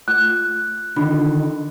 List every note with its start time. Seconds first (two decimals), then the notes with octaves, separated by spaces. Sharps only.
0.08 A3 F4 F#6
0.96 D3 D#3 D4 F4 B5